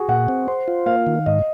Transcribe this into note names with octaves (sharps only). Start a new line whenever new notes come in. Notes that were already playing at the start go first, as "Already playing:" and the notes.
Already playing: F#4 G#4
A#2 F#5
C4
C5
F4
A#3 F5
D#3
G#2 D#5